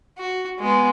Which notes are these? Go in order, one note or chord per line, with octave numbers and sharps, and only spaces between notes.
F#4
G#3 B3